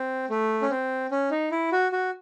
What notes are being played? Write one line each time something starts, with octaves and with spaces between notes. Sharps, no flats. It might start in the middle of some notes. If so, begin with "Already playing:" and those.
Already playing: C4
A3
C#4
C4
C#4
D#4
E4
F#4
F#4